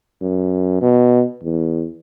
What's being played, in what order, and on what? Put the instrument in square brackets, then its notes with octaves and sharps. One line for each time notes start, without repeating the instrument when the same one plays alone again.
[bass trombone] F#2
B2
E2